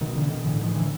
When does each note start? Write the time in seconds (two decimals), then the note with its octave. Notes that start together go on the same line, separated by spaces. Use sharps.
0.01 B2 D#3
0.16 D3 E3
0.30 D#3
0.45 A2 D3 E3
0.61 D#3 F3
0.76 D3 E3